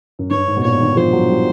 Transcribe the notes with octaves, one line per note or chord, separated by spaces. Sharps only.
F#2
G2 C#5
G#2
B2
A#2 C#5
D#3
F3 C5
F#3
G3